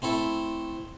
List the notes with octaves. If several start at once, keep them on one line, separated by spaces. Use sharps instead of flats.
A3 C4 E4 A4